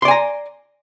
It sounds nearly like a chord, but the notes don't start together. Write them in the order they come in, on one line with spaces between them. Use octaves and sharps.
C6 D5 G#5 A#5